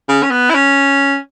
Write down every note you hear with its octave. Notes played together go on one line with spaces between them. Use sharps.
C#3
C#4
B3
E4
C#4